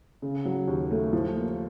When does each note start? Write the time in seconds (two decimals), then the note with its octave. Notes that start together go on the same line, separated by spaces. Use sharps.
0.22 C#3
0.45 F#3
0.67 D#2
0.91 A3
1.13 F3
1.36 A#3